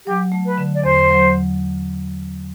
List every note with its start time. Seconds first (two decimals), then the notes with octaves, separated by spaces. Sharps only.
0.06 F#3 G4
0.32 A3
0.46 B4
0.58 D3
0.74 D5
0.84 E2 C5
1.11 F#3